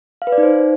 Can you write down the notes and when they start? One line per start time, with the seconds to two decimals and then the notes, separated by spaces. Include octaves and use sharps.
0.22 F5
0.27 B4
0.32 D5
0.38 D#4
0.43 C5